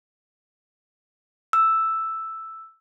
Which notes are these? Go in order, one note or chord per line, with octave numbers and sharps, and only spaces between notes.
E6